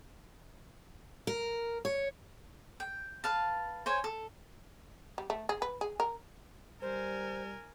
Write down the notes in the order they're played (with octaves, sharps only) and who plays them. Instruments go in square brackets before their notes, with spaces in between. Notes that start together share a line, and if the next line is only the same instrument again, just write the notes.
[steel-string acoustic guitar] A#4
C#5
[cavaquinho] G5
B4 F5 A5
C5 C#5 G#5
A4
[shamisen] G3
A3
G#4
B4
G#4
A#4
[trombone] G3 [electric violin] A#4 G#5 [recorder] C5